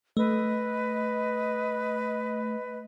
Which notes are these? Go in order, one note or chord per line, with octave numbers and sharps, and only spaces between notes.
A3 B4 D#5